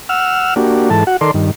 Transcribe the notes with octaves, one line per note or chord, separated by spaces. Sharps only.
F#5 E6 F6
A#3 D4 F#4 G4
G#2 E3 A4 A5
F#4 F#5
D#3 A4 A#4 D5 C6
G2 D#3